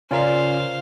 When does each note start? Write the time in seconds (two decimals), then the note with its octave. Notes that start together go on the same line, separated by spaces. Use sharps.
0.11 C#3 C#4 F4 A#4 C5 D5 E5 F5